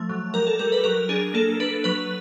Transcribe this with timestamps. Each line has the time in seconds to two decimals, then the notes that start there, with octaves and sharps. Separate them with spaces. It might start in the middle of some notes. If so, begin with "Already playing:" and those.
Already playing: F3 A3
0.09 F#3
0.34 G3 A#4
0.47 A4
0.59 G3 A#4
0.72 B4
0.84 F#3 A#4
1.09 D4 G#4
1.34 A#3 A4
1.60 D4 B4
1.84 F#3 B4